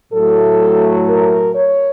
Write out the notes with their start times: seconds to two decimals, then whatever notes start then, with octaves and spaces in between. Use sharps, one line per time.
0.12 A2 F#3 A3 A4
1.07 A#4
1.54 C#5